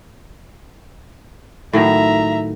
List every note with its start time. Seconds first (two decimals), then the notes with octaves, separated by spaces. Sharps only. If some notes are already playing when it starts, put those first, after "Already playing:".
1.73 A2 D#3 F#3 E5 A#5